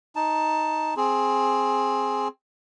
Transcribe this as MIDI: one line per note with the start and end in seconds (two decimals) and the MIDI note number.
0.16 0.94 63
0.16 0.94 81
0.97 2.28 60
0.97 2.28 68